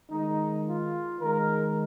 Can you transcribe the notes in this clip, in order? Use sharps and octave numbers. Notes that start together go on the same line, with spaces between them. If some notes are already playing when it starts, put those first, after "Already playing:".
D#3 G#3 D#4
F4
D#3 G#3 A#4